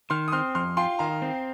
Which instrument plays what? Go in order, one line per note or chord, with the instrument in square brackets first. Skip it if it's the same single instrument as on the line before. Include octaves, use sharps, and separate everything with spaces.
[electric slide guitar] D#3 [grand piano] C6 F6
[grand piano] D#6
[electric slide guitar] C4 [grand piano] C6 F6
[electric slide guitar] F2 [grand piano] C6 F6
[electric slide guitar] F4 [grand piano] G5 C6
[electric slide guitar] D#3 [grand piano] F5 A#5
[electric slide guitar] C4